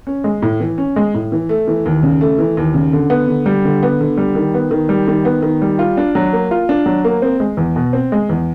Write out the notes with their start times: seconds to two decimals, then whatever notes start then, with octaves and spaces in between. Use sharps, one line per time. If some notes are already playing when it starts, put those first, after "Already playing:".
0.07 C#4
0.24 G#3
0.42 A2
0.60 E3
0.78 C#4
0.96 G#3
1.14 A2
1.32 E3
1.49 A3
1.68 E3
1.86 D#2
2.03 C#3
2.21 A3
2.39 E3
2.57 D#2
2.74 C#3
2.93 D3
3.10 B3
3.28 D3
3.46 G3
3.65 D3
3.83 B3
4.01 D3
4.17 G3
4.35 D#3
4.54 B3
4.71 D#3
4.89 G3
5.08 D#3
5.25 B3
5.43 D#3
5.62 G3
5.79 F4
5.97 D4
6.15 F#3
6.33 A#3
6.51 F4
6.69 D4
6.86 F#3
7.04 A#3
7.22 C4
7.40 G#3
7.57 E2
7.76 B2
7.93 C4
8.12 G#3
8.29 E2